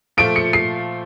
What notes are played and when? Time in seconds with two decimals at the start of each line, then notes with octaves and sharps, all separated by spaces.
0.17 A#2 F3 A3 D7
0.36 C#7
0.53 C7